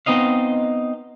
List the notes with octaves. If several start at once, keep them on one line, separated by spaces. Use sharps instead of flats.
B3 C4 D#4 D#5 F5